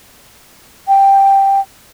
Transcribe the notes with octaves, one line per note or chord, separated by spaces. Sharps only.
G5